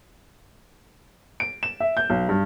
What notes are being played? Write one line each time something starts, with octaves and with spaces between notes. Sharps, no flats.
D7
E7
E5
G6
B1
G2